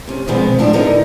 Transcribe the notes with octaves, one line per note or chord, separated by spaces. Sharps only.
C3 C#4
B2 D#3 F3 G#3 B3 C4
A2 F3 D4
A2 D3 B3 D#4 A#4